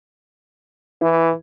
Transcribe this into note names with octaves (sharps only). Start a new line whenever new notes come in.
E3 E4